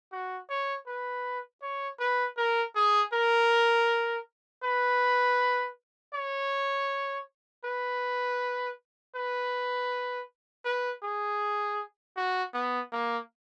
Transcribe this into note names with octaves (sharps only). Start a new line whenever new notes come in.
F#4
C#5
B4
C#5
B4
A#4
G#4
A#4
B4
C#5
B4
B4
B4
G#4
F#4
B3
A#3